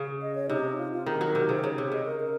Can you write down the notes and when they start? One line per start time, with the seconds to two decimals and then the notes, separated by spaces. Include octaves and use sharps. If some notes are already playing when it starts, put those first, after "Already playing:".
Already playing: C#3
0.22 D#5
0.35 C#5
0.49 C3 D#4
0.78 F4
0.92 F4
1.06 D#3 G#4
1.21 F#3 A#4
1.35 C3 A#4
1.49 C#3 C5
1.64 C#3 C#5
1.78 C3
1.92 C#3 D#5
2.06 A#4
2.20 A#4